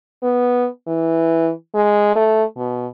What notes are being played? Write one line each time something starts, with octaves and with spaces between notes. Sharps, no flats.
B3
E3
G#3
A3
B2